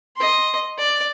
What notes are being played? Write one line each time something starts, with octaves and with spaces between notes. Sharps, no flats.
D#5 C6
D5